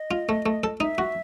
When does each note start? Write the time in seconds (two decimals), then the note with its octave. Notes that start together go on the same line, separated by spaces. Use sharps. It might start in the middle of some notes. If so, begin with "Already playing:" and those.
Already playing: D#5
0.11 F4
0.29 A3
0.46 A3
0.64 A4
0.80 D#4 E5
0.98 F#4